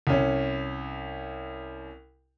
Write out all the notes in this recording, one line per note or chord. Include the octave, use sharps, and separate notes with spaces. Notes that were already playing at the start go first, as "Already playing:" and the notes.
C2 C#4